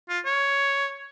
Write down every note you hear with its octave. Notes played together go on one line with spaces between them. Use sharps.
F4
C#5